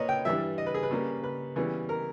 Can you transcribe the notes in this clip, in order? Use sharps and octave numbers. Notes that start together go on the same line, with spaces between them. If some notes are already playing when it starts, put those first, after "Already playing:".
Already playing: A#2 A#3 B4 C#5 D#5
G5
G2 E3 G3 E5
D#5
B4
G#4
B4
C#3 G3 A#3
B4
C#3 E3 G3 B3
A#4